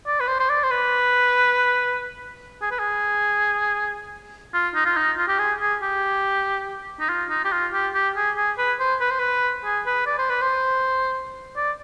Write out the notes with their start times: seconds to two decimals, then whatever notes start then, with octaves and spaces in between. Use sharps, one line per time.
0.07 D5
0.20 B4
0.28 C5
0.40 C5
0.49 D5
0.64 C5
0.71 B4
2.62 G#4
2.71 B4
2.79 G#4
4.54 F4
4.75 D#4
4.86 F4
4.97 D#4
5.18 F4
5.28 G4
5.39 G#4
5.60 G#4
5.82 G4
7.00 D#4
7.09 F4
7.30 D#4
7.45 G4
7.52 F4
7.73 G4
7.94 G4
8.16 G#4
8.37 G#4
8.58 B4
8.80 C5
9.01 B4
9.10 C5
9.19 B4
9.65 G#4
9.86 B4
10.06 D5
10.18 C5
10.30 B4
10.41 C5
11.57 D5